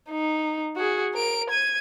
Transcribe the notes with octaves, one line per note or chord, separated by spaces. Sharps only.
D#4
F#4 G#4
A#4 D7
G#6 D#7